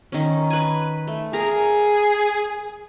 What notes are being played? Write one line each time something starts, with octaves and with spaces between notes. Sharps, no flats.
D#3 C#4
B4 G#5
A3
G#4 A#4